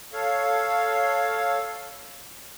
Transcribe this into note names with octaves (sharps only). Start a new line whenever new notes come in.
A4 C#5 F5